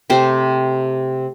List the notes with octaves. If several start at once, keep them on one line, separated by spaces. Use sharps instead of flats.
C3 A3 G4 C5